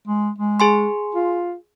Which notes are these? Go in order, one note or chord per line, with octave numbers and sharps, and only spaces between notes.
G#3
G#3
G#4 G#5 C6
F4